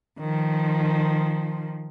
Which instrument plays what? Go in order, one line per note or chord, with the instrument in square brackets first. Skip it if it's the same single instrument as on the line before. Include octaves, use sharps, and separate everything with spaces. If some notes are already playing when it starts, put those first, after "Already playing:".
[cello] D#3 F3